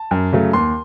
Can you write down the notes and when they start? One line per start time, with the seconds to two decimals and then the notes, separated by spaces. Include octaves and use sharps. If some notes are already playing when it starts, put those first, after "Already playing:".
Already playing: A5
0.11 F#2
0.33 C#3 F#3 A3
0.53 D#2 C6